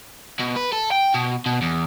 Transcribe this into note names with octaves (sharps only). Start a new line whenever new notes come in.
B2
B4
A4
G5
B2
B2
E2